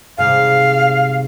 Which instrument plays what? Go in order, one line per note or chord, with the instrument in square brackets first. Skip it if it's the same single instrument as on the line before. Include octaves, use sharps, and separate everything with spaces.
[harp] G#2 C3 G3 [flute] F5